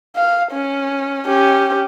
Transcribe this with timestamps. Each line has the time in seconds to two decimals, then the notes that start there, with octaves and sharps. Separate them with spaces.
0.16 F5
0.52 C#4
1.26 C#4 G4